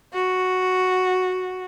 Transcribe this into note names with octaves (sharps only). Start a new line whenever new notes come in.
F#4